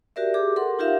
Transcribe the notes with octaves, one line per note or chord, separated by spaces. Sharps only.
F#4 G4 A#4 D5 E5
G4 G#4 D6
A4 A#4 F#5 C6
D#4 F4 G4 A#4 E5 F5